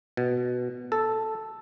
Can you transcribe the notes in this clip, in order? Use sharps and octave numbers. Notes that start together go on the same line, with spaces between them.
B2
A4